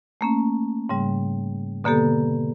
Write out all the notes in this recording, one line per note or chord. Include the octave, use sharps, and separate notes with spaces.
A3 A#3 C#4
G#2 C#3 G3
B2 D3 A#3 B3 G4 A4